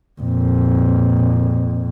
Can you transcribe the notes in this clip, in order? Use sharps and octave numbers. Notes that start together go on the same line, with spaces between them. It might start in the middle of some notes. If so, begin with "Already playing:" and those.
F2 A#2